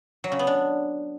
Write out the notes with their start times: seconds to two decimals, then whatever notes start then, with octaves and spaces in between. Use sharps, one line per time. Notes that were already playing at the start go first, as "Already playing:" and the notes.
0.24 F#3
0.32 C#3
0.39 B3
0.47 D4